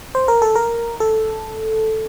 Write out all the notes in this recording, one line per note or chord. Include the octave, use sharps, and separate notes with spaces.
C5
A#4
A4
A#4
A4